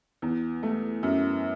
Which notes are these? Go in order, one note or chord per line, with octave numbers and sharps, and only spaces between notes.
E2
A3
F#2